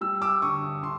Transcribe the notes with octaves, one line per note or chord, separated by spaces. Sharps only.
G3 E6
D6 E6
D3 C#6 D#6
D3 C6